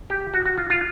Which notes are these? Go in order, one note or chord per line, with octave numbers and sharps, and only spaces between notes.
G4
F#4
F#4
F4
F4